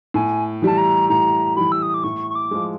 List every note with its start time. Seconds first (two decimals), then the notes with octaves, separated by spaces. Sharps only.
0.14 A2 G#5
0.62 E3 G3 A5
0.78 A#5
1.10 A2 A#5
1.56 E3 G3 B5
1.72 E6
1.82 D#6
1.94 D6
2.04 A2 C#6
2.31 C#6
2.35 D6
2.51 F3 G#3